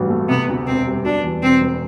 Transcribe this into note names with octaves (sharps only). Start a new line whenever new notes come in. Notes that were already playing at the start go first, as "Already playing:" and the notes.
Already playing: A1 G2 F#3
A3
C3 B3
D2
E1 C4
G3
B2 D4
E2
E1 C4
E1